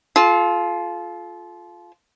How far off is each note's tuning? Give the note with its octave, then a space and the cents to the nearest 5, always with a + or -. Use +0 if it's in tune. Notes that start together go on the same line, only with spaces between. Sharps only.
F4 +0 A4 -40